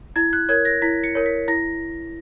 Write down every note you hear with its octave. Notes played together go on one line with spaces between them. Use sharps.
E4 G#6
F#6
A#4 C#5 G#6
A#6
E4 B6
C#7
A#4 C#5
B6
E4 A#6